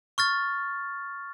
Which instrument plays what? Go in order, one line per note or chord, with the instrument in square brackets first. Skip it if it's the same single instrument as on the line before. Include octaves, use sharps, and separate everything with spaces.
[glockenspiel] C#6 F6 A6